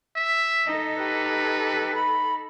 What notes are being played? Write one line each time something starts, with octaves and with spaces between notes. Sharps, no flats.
E5
D#4 A4 D#5
G4 B4
B5